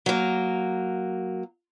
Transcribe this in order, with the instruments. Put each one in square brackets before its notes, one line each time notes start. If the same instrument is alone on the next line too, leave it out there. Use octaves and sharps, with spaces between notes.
[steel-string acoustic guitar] F#3 A#3